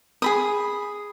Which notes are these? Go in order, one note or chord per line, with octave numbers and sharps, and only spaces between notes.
G#4 B5 D#6